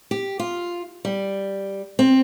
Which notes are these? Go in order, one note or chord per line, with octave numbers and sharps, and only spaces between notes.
G4
F4
G3
C4